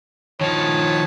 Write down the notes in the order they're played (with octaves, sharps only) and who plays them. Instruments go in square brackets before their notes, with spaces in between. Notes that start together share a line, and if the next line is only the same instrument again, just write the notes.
[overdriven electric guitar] D#3 F3 [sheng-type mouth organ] C#5 A5